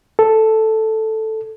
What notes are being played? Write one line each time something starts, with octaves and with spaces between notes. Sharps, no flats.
A4